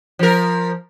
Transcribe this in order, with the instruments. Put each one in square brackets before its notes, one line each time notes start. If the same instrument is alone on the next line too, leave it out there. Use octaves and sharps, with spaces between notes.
[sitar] F3 A#4